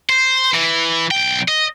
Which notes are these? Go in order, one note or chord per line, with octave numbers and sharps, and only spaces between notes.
C5
E3
B1 G5
D#5